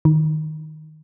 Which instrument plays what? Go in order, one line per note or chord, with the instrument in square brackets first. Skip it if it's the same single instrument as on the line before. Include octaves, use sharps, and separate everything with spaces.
[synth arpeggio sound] D#3